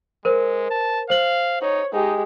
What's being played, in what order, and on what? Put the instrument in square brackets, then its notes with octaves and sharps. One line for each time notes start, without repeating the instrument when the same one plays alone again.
[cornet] G#3 [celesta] A#4 C5
[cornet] A5
[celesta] C5 F#7 [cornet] F5
[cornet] D#4 [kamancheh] C#5
[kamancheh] G#3 G4 [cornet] D#4